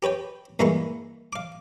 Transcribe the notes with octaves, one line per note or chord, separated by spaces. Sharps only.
G4 B4 C#5 G5
G2 E3 G#3 A#3 B5 C#6
F5 D6